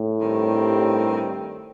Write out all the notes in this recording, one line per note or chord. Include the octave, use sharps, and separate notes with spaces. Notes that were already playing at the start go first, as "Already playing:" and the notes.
Already playing: A2
G2 D#3 G3 C4